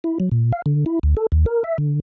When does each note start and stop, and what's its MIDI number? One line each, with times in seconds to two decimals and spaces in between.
0.04 0.18 64
0.20 0.29 54
0.32 0.52 46
0.53 0.62 77
0.66 0.85 50
0.86 0.99 64
1.03 1.15 38
1.17 1.26 69
1.32 1.45 39
1.46 1.63 70
1.64 1.77 76
1.78 2.00 50